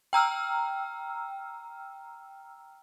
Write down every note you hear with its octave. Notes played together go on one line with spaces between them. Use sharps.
G5 A#5 E6 F6